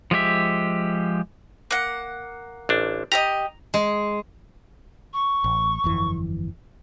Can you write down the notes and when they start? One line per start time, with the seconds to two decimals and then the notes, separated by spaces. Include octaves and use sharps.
0.11 F3 G#3 G4 E5
1.71 A#3 F#5
2.69 A1 D4
3.12 G4 A4 D#5 A#5
3.74 G#3
5.13 C#6
5.44 A1
5.84 G1 F2 E3